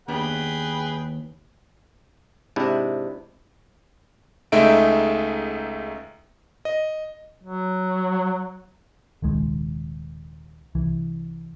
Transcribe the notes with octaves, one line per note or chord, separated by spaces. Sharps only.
D#2 B3 D4 G#4 B4 G5
G#2 C3 D4 E4
C#2 G#3 A3 D#4 E5 D7
D#5
F#3
D#1 C2 D#3 G#3
C2 E3